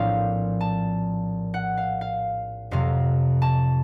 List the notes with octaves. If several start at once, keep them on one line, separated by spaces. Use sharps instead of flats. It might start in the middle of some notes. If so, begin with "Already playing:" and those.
Already playing: A#1 A2 F3 C4 F5
A5
F#5
F5
F5
F2 C3 F#3 F5
A5